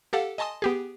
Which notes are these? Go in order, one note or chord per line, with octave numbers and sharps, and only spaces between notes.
G4 A4 F5 F#5
D#5 G#5 A5 C6 D#6
B3 G4 G#4